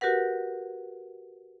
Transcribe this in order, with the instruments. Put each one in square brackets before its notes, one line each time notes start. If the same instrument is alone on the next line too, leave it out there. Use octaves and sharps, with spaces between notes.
[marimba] F#4 G4 A#4 B4 F#5